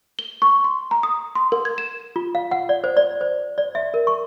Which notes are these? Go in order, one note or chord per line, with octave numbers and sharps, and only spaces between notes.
G7
C#6
C6
A#5
D#6
C6
A#4
G#6
E7
F4
F5
F#5
D5
C5
D5
C5
D5
E5
A#4
C#6